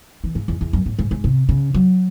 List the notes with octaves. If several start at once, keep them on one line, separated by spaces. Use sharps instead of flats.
E3
G#2
E2
E2
F#2
A2
G#2
G#2
C3
C#3
F#3